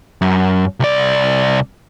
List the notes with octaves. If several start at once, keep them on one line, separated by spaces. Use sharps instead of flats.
F#2
C2 D5